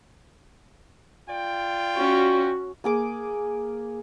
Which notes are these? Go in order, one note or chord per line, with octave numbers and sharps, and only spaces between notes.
F4 D5 G5
C#4 F#4
A#3 G#4 D6